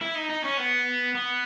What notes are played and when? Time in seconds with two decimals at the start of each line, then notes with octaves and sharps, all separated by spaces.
0.01 E4
0.15 D#4
0.30 D#4
0.44 C#4
0.58 B3
1.15 B3